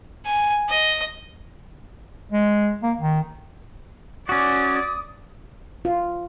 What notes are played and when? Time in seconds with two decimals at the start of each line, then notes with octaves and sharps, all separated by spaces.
0.25 G#5
0.69 D#5
2.32 G#3
2.83 A#3
2.99 D#3
4.29 C#4 F#4 D5 D#6
5.85 F4